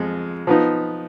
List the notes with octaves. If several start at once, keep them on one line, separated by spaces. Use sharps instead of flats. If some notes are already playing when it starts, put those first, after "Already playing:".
Already playing: F2 F3 G#3
F3 B3 D#4